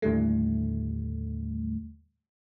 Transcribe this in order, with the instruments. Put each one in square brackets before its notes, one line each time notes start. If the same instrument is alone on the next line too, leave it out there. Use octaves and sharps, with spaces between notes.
[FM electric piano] D#2 A2 D3 G3 A3